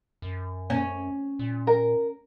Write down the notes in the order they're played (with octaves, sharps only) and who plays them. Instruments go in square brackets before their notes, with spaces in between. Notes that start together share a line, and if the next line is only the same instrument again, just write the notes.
[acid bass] F#2
[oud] C#4
[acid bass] A#2
[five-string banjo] A#4